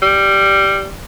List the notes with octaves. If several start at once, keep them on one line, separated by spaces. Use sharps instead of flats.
G3